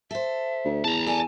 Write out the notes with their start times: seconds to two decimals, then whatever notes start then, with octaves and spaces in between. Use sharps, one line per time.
0.11 A4 C5 E5
0.64 D2
0.85 E2 A5 A#5
1.07 A4 D5 G#5